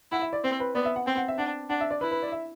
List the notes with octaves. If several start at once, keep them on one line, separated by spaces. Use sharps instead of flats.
E4 F#5
E5
D5
C4 C5
B4
B3 D5
E5
F#5
C4 G5
F#5
E5
D4 F#5
D4 F#5
E5
D5
E4 B4
B4
D5
E5